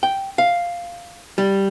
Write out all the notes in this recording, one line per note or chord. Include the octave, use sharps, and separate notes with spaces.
G5
F5
G3